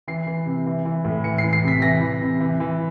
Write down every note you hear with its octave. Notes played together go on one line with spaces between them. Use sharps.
E3 C7
E3
C3
E3
E3
A2
E3 C#7
C7
E3
C7
C3 B6
E3 A#6
E3
C3
E3
E3